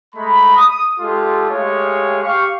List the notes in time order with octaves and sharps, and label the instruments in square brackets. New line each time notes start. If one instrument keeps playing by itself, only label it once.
[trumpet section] G#3 A3 A#5 B5
D#6
G#3 F4 G4 A4
G#3 A3 G4 G#4 C#5 F5
G4 F5 C#6